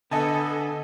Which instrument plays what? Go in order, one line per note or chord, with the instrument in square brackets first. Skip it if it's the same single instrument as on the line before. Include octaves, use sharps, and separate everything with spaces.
[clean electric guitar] D3 [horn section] B3 [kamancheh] A4 [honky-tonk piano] D#5 G#5 A5